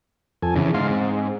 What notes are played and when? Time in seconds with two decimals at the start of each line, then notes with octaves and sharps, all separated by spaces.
0.42 F2 A4 G#5
0.55 E2 C#3
0.74 G#2 F5 C6
0.91 C4